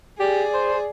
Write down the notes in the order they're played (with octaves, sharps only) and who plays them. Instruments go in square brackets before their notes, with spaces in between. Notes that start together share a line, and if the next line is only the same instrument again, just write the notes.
[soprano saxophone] G4 [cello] G#4 [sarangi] D5
[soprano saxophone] C5